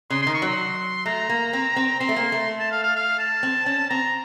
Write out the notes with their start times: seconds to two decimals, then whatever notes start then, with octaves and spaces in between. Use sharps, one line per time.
0.10 C#3 C6
0.22 D#3 C6
0.34 C#6
0.42 F#3 C6
1.06 A3 A#5
1.29 A#3
1.53 C4
1.76 C4
2.00 C4 C6
2.09 A3
2.16 A#3
2.32 A3
2.59 A5
2.72 F5
2.83 F5
2.96 F5
3.19 A5
3.43 C4
3.66 C#4
3.90 C4 A#5